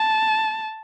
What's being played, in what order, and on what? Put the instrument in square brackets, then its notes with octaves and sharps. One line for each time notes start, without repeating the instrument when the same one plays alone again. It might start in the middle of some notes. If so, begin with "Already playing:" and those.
Already playing: [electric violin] A5